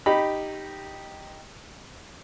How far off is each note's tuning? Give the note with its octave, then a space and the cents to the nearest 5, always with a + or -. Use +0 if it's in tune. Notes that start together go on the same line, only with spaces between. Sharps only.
D#4 -5 G4 +0 B5 +0